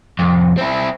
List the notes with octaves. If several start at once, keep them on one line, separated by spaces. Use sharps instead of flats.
C2 F2
C4 E4